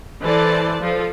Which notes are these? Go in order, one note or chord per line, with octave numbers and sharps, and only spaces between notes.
E3 A4 B4 C5 D5 A5
F3 A4